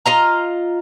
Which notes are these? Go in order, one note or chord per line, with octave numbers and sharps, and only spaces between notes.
F4 D#5 A#5